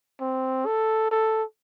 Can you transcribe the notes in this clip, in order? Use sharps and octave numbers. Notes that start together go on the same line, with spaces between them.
C4
A4
A4